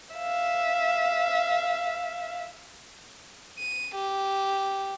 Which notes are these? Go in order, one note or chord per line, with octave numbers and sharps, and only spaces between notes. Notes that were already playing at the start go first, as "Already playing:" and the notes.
E5 F5
D#7
G4